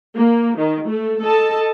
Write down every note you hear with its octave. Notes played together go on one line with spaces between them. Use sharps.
A#3
D#3
A3
A4 D#5 A5